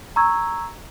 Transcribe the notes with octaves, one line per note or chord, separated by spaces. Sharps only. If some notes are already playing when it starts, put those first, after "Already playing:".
A#5 C#6 E6 G#6